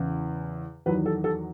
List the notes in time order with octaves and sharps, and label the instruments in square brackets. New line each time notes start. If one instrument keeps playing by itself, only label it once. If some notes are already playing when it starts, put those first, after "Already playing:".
Already playing: [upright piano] E2 C#3 E3
E2 D#3 F#3 B4
A4
A4